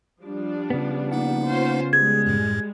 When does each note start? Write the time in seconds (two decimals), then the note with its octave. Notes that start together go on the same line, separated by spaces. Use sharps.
0.21 F3 G3 D4
0.70 C#3 B3
1.12 A#3 D#4 F#5
1.44 C#4 F4 C5
1.93 G3 G#3 G#4 G#6
2.26 F#2 A2